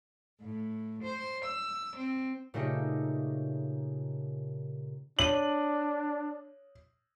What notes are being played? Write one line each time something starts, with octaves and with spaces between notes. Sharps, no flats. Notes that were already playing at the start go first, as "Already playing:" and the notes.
A2
C5
E6
C4
A#2 C#3 A3 D#4 G4
D4 C#5 D#7 F#7